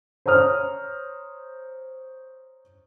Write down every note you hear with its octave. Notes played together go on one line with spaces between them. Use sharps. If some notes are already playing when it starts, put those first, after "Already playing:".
C5 C#5 A#5 D#6 F6